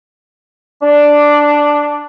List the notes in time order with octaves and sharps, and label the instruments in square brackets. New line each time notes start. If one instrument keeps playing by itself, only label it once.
[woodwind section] D4